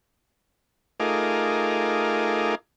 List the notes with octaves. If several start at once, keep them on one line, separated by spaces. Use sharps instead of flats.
A3 D#4 F4 G#4 A#4 D6